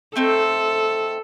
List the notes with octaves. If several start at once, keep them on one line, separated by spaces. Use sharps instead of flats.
A3 C4 D#4 A4